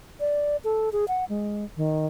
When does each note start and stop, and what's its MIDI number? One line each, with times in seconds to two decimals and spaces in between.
0.20 0.57 74
0.64 0.89 69
0.92 1.05 68
1.08 1.25 78
1.29 1.65 56
1.77 2.07 51